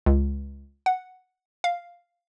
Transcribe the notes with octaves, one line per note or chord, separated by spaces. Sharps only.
C#2
F#5
F5